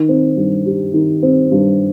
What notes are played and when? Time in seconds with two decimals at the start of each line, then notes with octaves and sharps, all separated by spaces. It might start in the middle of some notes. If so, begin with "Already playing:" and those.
Already playing: D#3
0.09 C4
0.36 G2
0.66 G3
0.94 D#3
1.23 C4
1.51 G2